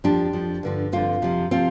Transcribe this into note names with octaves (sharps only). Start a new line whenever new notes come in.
F2 F3 D4 G4
F2 F3
G2 D3 F3
G2 D3 F3 C4 F4
F2 C3 F3
C3 F3 C4 F4